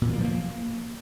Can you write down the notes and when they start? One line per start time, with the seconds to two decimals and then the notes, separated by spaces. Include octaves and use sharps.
0.02 A#2
0.07 E3
0.13 A#3
0.19 F3
0.24 A#3